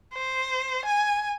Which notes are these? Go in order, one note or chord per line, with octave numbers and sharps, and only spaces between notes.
C5
G#5